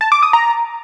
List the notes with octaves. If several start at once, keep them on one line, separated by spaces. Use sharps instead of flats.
A5
D6
D#6
A#5